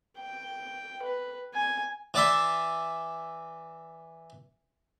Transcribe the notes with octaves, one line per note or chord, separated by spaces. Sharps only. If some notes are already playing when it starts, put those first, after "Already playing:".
G5
B4
G#5
E3 D5 E5 C6